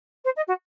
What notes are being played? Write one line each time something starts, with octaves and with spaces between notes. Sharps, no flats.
C5
D#5
F#4